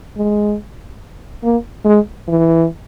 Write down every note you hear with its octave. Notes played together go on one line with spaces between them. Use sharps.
G#3
A#3
G#3
E3